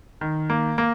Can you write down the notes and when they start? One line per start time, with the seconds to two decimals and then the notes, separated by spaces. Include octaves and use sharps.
0.21 D#3
0.50 A#3
0.78 A#3